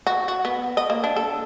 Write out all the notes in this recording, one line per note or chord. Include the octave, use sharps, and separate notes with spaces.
F#4
F#4
B3
D#5
A#3
D4
A4